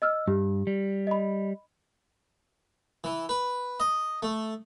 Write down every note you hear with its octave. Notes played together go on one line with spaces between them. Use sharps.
D#5 E6 F6
G2 G4
G3
D#5 B5
E3
B4
D#5
A3